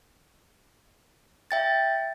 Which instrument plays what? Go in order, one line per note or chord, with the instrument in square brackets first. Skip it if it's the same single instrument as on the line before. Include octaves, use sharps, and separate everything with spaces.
[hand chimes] E5 G5 A6